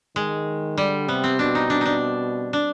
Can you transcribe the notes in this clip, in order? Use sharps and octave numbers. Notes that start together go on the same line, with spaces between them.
D#3 G#3
D3 G3
C3 B3
C4
B2 D4
D#4
D4
D4 D#4
D4